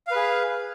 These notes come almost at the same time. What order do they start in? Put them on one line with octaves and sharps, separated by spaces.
F5 B4 G#4